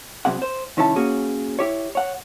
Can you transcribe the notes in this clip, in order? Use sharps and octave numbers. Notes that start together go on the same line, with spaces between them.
C2 F#2 C3 G#4 F#5
C5
C2 D#3 C#4 E4 D5 A5
A#3 C#4 F#4 G#4
E4 G4 C#5
C#5 F#5